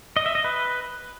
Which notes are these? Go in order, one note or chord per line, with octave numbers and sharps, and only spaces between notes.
D#5
E5
D#5
B4